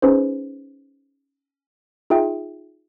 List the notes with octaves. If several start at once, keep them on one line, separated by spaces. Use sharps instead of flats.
C#4 D#4 G#4 B4 C5
D#4 F4 G#4 E5 G5